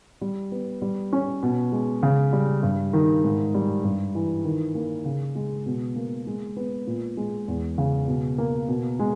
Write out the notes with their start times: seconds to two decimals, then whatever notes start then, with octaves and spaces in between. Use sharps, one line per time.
0.21 G3
0.52 B3
0.82 G3
1.13 C#4
1.43 B2
1.72 G#3
2.03 C#3
2.33 G3
2.63 G2
2.93 D#3
3.24 G#2
3.55 G3
3.84 G2
4.15 E3
4.44 D#3
4.75 A#3
5.05 C#3
5.35 G#3
5.66 B2
5.96 A#3
6.27 G#3
6.57 B3
6.87 A#2
7.17 G#3
7.48 E2
7.78 C#3
8.08 B2
8.38 A#3
8.69 B2
8.99 G#3